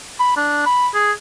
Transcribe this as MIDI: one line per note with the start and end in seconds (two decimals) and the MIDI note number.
0.20 0.34 83
0.37 0.62 62
0.66 0.89 83
0.94 1.12 68